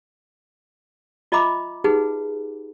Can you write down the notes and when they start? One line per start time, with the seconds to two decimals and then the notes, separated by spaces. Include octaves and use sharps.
1.32 F4 D#5 E5 A#5 B5 D6
1.84 D#4 G4 G#4 B4 F#5